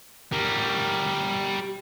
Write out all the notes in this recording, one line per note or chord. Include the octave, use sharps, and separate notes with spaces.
G3 A#4